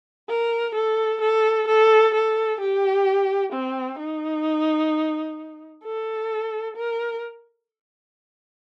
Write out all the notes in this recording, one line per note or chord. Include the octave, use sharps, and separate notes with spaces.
A#4
A4
A4
A4
A4
G4
C4
D#4
A4
A#4